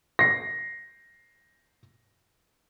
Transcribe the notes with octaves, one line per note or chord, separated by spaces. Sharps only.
A#6 C7